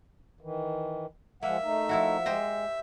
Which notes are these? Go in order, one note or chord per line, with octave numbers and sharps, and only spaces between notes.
D#3 E3
F3 G#3 A#3 E5 F#5
A3 D#4
F3 E4 F#4
G#3 G4 C5 D#5